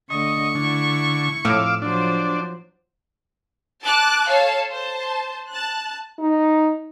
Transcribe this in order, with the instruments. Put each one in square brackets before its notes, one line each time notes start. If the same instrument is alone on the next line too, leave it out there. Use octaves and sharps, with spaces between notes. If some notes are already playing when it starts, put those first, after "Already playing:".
[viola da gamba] D3 A3 [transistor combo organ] D#5 [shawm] C#6
[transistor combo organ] D3 [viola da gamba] E4
[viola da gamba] F2 [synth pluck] A2 [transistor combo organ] F5 D6 E6
[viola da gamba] F3 F#3 C5 [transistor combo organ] D4
[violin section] A5 D6 F#6
A4 C#5 F5 A5
C5 A5
A5 F#6
[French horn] D#4